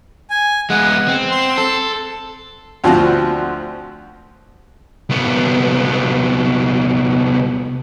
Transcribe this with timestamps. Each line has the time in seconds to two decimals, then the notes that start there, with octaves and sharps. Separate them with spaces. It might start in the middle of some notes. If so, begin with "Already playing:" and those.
0.30 G#5
0.70 G#3 B3 F#5
1.08 C4
1.31 C6
1.58 A4
2.84 D2 F3 C4 F4 F#4
5.10 C2 B3